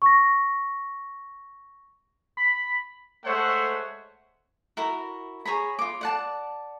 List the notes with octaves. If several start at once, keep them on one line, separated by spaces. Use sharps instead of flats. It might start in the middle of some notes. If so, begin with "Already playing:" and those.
C#6 A#6
B5
G#3 A3 C5 C#5 E5 F#5
E4 F#4 A#4
G#4 C#5 A#5 B5
F4 D6
D5 F#5 A5